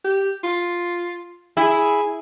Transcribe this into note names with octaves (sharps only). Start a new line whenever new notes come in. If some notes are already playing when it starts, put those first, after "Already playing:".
G4
F4
E4 G#4